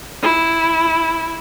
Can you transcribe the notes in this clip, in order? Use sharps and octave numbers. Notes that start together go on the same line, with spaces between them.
E4